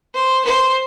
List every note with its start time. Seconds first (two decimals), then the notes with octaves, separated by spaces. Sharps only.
0.15 C5
0.45 C5